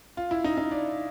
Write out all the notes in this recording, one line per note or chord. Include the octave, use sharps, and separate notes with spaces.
F4
E4
D#4
D#4
D4